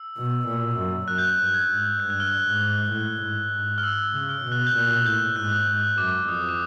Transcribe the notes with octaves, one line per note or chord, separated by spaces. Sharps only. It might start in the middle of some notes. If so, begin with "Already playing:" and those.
Already playing: E6
B2
A#2
F#2
F#2 F#6
G6
F#6
G2
G#6
G#2
G2 G6
F#6
F6
F#6
G#2
A2
G#2
G#2
F6
E6
C#3
F6
B2
F#6
G6
A#2 F#6
A2 G6
G#2 F#6
G#2 F#6
F#2 D6
F2 D#6
D6